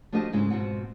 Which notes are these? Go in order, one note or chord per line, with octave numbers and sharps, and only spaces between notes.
F3 A3 D4 F#4 G4 D#5
G#2 C#3 G#3 E4
F2 G#2 B2 C4 F#5